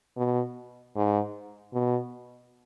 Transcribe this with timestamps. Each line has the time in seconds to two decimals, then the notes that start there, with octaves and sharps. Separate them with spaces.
0.17 B2
0.96 G#2
1.74 B2